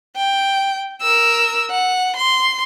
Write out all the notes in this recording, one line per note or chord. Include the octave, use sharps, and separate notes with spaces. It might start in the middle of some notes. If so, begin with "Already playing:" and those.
G5
A#4 E6
F#5
C6